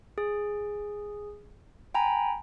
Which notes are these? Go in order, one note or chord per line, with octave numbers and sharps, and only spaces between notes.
G#4
G5 G#5 A#5 B5